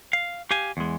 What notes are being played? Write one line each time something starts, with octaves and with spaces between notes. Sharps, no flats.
F5
G4 F5 G#5
E2 G#3